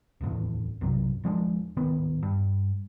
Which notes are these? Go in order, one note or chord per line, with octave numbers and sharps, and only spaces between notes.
D1 G#1 E2 A2
B1 F#2 C3 F#3
D#1 F3 G#3 D4
D1 G#1 D#3 B3
G2